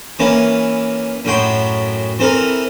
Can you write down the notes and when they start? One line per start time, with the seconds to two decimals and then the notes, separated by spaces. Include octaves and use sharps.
0.19 E3 A#3 C#4 E4
1.25 F#2 A2 F#3 G5 B5 C6
2.19 E3 C4 A4 A#4